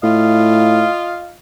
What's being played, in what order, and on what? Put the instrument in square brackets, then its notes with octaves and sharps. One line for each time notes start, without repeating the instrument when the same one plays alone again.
[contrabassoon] A2 [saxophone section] F4 D#5 F5